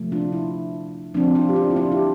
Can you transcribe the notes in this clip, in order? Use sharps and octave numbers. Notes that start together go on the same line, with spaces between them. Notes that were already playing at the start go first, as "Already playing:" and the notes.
Already playing: C3 F3 A3
D4 F4
E4
F3 C4 D4
D4 F4
G4
D4 F4
E4
D4 F4
E4 G4